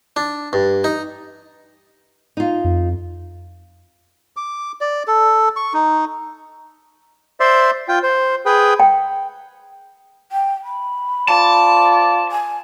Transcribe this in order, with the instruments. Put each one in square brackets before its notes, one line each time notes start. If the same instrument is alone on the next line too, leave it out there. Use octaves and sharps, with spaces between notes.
[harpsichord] D4
G2
D#4
[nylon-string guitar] D#4 F4
[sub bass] F2
[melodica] D6
D5
A4
C#6
D#4
[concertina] C5 D5 E5 C6
F4 G5
C5
G#4 B4 G5
[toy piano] G5
[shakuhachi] G5
B5
[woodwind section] F4 C5 D5 [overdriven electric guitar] A5
[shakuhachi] G#5